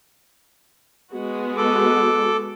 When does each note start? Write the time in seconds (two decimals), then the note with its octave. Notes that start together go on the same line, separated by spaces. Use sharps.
1.13 G#3 B3 F#4
1.57 A4 D6